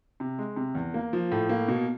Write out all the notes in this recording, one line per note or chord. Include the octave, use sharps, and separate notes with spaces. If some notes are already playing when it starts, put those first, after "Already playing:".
C3
G#3
C3
E2
A#3
F3
A2
A#3
B2